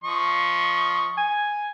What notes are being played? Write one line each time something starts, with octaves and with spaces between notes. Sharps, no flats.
F3 D#5 C#6
G#5